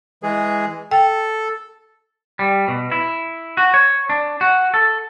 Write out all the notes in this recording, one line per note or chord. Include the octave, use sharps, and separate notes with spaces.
E3 G#3 G#4
A4 G5
G3
B2
E4
F#4
C#5
D4
F#4
A4